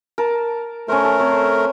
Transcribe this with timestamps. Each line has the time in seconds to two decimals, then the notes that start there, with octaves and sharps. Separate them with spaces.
0.18 A#4 A5
0.88 A3 C#4 A#4 C5
1.05 A4
1.19 C4 C#4 C5